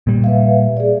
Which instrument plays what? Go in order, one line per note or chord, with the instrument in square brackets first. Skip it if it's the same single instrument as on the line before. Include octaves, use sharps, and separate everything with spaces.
[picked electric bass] A#2 G3
[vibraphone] B4 E5 F5
G#4 D5